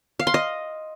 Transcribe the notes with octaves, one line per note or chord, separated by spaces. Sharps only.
F5
C6
D#5